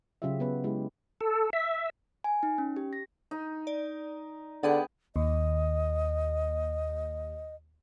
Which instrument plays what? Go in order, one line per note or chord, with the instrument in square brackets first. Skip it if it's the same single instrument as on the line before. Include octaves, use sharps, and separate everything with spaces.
[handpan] C#3 F#3 F4 G4 E5
B3 C#4 B4
G#3 E4 G4
[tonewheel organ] A4
E5
[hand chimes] G#5
D#4
C#4
G4
A#6
[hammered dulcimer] D#4
[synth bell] D5
[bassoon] D3 [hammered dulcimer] B3 G5 [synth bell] D4 G#4 F#5
[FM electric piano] D#2 [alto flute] D#5